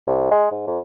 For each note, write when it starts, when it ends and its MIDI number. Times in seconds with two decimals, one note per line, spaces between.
0.07 0.30 36
0.31 0.48 56
0.52 0.66 44
0.67 0.79 41